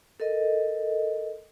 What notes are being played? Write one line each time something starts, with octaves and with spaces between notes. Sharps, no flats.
A4 A#4 D#5